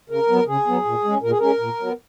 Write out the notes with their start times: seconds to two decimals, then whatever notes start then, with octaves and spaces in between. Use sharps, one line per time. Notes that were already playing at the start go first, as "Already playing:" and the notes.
0.10 C#3 A#4
0.29 F#3 B3
0.47 C#3 G#4
0.67 F#3 B3
0.85 A#2
1.04 G#3 C#4
1.22 A#2 A#4
1.30 G#4
1.39 G#3 C#4 A#4
1.59 A#2
1.79 F#3 B3